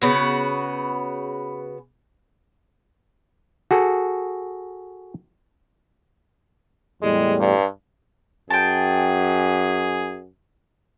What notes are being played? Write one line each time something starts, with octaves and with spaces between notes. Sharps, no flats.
C#3 B3 F#4
F#4 G#4 A4
E2 A2 G3 G#3
G2
F#2 G#4 G5 A5